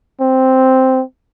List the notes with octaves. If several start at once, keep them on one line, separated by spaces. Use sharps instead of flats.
C4